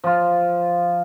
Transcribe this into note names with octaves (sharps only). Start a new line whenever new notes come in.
F3 F4